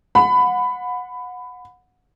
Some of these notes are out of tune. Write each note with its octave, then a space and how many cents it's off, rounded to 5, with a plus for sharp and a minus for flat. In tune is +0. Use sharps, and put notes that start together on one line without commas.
F#5 -25 B5 +20